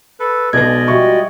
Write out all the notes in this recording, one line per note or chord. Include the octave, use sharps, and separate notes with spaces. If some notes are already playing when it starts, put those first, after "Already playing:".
A4 B4
B1 B2 G#3 D5 D#5 G#6 A#6
F3 G3 F#4 E5 C#6